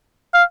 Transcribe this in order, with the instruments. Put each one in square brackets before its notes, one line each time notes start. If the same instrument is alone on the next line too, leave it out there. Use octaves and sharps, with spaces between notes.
[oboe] F5